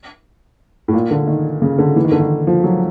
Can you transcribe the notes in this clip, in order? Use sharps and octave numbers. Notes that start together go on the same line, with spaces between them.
A2
A#2
D3
D#3
C#3
D3
E3
D#3
D3
D#3
F3
F#3